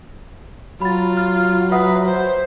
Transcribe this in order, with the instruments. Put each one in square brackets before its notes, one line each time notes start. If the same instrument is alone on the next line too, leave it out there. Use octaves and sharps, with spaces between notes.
[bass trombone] F#3 [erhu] F4 [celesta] B5 A6
[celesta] F6
[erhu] B4 [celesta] E5 F#5 D#6
[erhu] C5